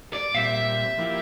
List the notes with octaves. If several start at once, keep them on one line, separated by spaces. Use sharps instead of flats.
D5
A#2 G3 C4 E5
F3 A#3 E4 G4